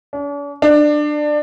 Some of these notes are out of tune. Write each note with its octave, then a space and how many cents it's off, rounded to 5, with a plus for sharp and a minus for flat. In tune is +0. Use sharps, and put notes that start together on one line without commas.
D4 -45
D4 +20